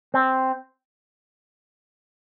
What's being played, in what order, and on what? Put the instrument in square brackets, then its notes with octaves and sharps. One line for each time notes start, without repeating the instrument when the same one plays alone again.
[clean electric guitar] C4